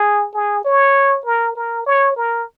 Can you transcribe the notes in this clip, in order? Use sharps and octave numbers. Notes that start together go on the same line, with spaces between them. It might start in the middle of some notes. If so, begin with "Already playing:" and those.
Already playing: G#4
G#4
C#5
A#4
A#4
C#5
A#4